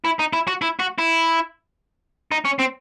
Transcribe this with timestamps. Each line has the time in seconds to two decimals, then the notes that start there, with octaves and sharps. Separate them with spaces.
0.04 E4
0.19 D#4
0.33 E4
0.48 F#4
0.62 E4
0.79 F#4
0.98 E4
2.32 D#4
2.45 C#4
2.60 C4